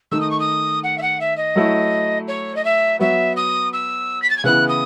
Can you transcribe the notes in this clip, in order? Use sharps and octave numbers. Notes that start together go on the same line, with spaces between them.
D#3 A3 D#4 E6
D#6
C#6
D#6
F#5
E5
F#5
E5
D#5
F#3 A3 E4
C#5
D#5
E5
F#3 B3 F#4 E5
D#6
E6
B6
A6
G#6
C#3 E3 B3 E4 F#6
D#6